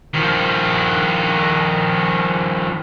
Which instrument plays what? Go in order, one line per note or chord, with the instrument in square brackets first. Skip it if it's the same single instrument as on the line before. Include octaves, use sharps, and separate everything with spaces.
[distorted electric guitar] D#3 F3